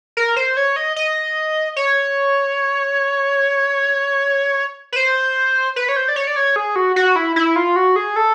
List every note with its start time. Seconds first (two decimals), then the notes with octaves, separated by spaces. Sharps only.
0.17 A#4
0.36 C5
0.57 C#5
0.76 D#5
0.96 D#5
1.76 C#5
4.92 B4
4.96 C5
5.76 B4
5.89 C#5
5.96 C5
6.09 D5
6.16 C#5
6.27 D5
6.36 C#5
6.56 G#4
6.76 F#4
6.96 F#4
7.16 E4
7.36 E4
7.56 F4
7.76 F#4
7.96 G#4
8.16 A4